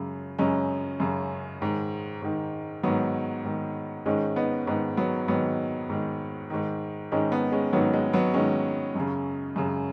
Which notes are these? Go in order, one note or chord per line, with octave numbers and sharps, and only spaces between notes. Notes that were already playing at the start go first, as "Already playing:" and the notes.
Already playing: F#2 C#3
F#2 C#3 G#3 C#4
F#2 C#3
G#2 D#3
G#2 D#3
G#2 D#3 F#3 B3
G#2 D#3
G#2 D#3 G#3 C#4
B3 D#4
G#2 D#3 B3 D#4
F#3 B3
G#2 D#3 F#3 B3
G#2 D#3
G#2 D#3
G#2 D#3 G#3 C#4
B3 D#4
G#3 C#4
G#2 D#3 F#3 B3
G#3
F#3 B3
G#2 D#3 G#3 C#4
F#2 C#3
F#2 C#3